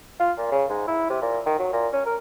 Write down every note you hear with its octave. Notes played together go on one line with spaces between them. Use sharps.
F4
A#2
C#3
G#2
E4
C3
A#2
D#3
F#3
A#2
C#4
A#4